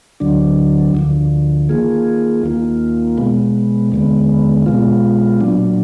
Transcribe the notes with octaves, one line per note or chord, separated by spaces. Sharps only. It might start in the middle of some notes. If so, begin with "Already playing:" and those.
D2 D3 F#3 D4
D2 D3 F3
D#3 A#3 F4 G#4
D#2 D#3 A#3 F4
B2 G#3 B3
D#2 D3 G#3 B3
B2 G#3 B3 F4
A#2 F#3 D4